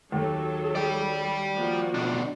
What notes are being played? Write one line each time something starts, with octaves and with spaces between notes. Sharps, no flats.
D#2 F#3 A4
D5 G5
F3 A#3 F#4
B2 D4